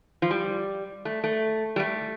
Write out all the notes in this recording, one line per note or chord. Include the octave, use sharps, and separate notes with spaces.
F3
G3
A3
A3
G3
A3